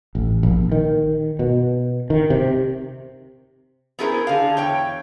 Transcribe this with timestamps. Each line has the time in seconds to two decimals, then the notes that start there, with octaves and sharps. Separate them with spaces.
0.15 A1
0.43 A#1
0.72 D#3
1.39 B2
2.10 D#3
2.30 C3
3.99 B3 C#4 E4 G#4 A#4 C5
4.27 D3 G#4 F5
4.57 E2 C#5 G5